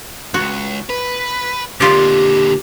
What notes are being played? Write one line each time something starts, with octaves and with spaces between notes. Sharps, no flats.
C#2 F#4
B4
D3 A#3 F4 G4 D5